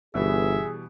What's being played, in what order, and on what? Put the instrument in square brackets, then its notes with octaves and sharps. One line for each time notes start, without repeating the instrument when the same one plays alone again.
[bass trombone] G1 [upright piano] B2 E3 G3 [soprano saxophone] G#4 [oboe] E5